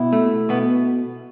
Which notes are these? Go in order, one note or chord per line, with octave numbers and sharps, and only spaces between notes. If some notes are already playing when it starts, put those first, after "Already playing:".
Already playing: B2 E4
A3
B2 B3